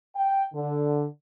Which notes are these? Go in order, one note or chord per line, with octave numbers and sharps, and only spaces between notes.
G5
D3